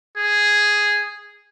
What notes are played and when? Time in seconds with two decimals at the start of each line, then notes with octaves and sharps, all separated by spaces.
0.17 G#4